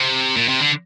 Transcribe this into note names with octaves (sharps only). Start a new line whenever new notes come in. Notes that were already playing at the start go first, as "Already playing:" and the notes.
Already playing: C3
A#2
C3
D3